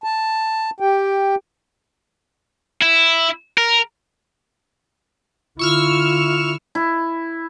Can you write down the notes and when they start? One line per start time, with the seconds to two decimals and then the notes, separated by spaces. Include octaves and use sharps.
0.04 A5
0.80 G4 G5
2.82 E4
3.58 A#4
5.59 D3 E4 F4 C#6 E6 F6
6.75 E4